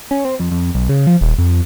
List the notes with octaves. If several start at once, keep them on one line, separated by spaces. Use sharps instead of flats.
C#4
C4
F2
F2
B1
C#3
F3
D#1
F2